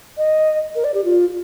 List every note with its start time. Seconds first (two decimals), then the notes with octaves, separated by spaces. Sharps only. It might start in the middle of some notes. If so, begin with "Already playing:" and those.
0.17 D#5
0.75 A#4
0.84 D5
0.94 G4
1.04 F4